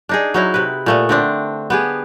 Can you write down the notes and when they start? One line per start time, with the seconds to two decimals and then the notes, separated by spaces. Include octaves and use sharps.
0.09 D4 D#4 G#4
0.34 F#3 D#4 E4
0.54 C3 B4
0.86 A#2 A3 B3
1.09 D3 C4 D4
1.70 B3 G4 G#4